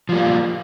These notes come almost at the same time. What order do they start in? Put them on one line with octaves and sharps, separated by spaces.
F3 G3 A#3